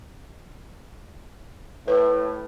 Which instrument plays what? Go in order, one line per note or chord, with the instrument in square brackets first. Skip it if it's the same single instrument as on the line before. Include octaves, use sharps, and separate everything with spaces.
[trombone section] A2 [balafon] B4